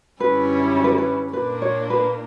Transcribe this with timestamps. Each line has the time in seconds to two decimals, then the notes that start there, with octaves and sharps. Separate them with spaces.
0.20 F#2 D3 G3 C#4 E4 B4
0.77 C#5
0.84 B4
0.91 A#4
0.98 B4
1.33 A#2 A#3 D4 B4
1.62 C#5
1.90 B4